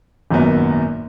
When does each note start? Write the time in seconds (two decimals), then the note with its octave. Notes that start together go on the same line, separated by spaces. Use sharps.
0.31 G#1 F#2 A#2 F#3 B3 A#4